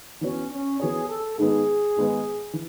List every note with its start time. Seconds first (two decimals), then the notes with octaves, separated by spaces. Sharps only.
0.21 E3 B3 C#4 F#4 C#5
0.51 C#4
0.80 E3 B3 F#4 G#4 C#5
1.09 A4
1.38 G#2 D#3 G#3 B3 G#4
1.96 G#2 D#3 G#3 B3
2.53 E3